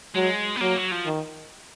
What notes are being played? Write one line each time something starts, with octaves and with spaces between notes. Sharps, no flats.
F#3 G#3
B3
F#3 A#3
F#3
F3
D#3